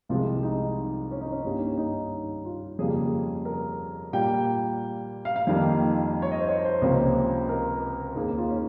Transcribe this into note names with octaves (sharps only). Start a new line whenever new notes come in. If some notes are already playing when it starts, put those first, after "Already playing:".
C2 C3 F3 G#3 F4
D#4
C#4
D#4
C#4
G2 G3 A#3
C#4
D#4
F4
F2 C#3 G3 A#3 G#4
A#4
A#2 G3 A#3 G5
F5
F5
F2 D#3 G3 A#3
C#5
D#5
C5
C#5
C5
C#2 C3 F3 A#3
A#4
D#2 D#3 A#3 G#4
F4
C#4